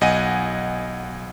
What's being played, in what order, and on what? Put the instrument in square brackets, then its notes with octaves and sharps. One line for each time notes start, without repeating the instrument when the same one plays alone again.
[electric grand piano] B1 D#5 F#5 G#5 D#7